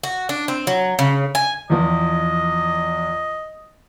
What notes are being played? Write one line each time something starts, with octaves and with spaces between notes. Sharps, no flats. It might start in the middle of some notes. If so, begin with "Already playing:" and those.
F#4
D4
C4
F#3
C#3
G#5
E2 F3 D#5